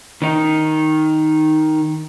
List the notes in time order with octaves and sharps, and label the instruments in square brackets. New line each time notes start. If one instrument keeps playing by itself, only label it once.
[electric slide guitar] D#3 D#4